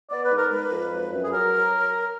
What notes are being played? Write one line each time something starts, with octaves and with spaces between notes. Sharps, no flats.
B3 D5
B4
G#2
A#4
G#3 B4
F2
F#3
F#2
G#4
F#3 A#4